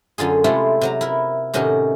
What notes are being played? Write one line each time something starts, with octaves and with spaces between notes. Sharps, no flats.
F#2 D3 F4 G#4
C3 G#3 A3 E4 F4 F#5
C3 F#3 A#5
E4 A#4
A2 C3 D#3 C#4 F#4